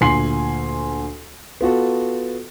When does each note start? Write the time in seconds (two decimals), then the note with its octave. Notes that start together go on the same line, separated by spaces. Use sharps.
0.01 D2 A#2 G#5 C6 C7 F#7
1.61 B3 F4 F#4 A4